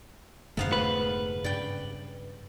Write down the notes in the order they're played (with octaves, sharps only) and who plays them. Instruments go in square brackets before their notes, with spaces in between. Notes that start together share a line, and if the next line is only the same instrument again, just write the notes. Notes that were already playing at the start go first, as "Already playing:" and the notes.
[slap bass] F1 D3 A3 [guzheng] G#2 B3 F5
[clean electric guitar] B4
[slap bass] G2 C#3 [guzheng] D5 G5